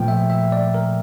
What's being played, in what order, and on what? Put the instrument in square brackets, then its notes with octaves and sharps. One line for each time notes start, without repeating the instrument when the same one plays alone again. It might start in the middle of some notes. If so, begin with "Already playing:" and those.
Already playing: [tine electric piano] A#2 F3 A3 G5
E5
E5
D5
A#4